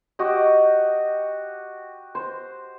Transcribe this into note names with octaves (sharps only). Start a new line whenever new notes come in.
F#4 G4 D#5
C5